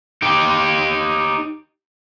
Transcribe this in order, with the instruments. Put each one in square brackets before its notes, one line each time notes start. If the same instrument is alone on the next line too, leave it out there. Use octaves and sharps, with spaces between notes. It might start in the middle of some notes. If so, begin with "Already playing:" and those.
[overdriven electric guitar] D#4 G4